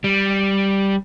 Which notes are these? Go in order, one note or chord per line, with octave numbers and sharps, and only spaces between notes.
G3